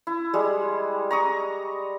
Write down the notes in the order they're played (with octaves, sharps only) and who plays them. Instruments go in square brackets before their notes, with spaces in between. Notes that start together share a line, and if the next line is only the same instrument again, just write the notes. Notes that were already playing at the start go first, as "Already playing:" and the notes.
[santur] E4
G3 G#3
A#5 C#6 D#6